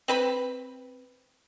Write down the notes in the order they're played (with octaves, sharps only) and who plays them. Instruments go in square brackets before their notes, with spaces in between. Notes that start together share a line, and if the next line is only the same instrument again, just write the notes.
[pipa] C4 B4 B5